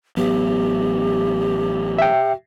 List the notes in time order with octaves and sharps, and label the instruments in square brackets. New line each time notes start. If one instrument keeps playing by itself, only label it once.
[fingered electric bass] A1 F#3 B3 [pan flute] G4
[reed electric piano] E5 G5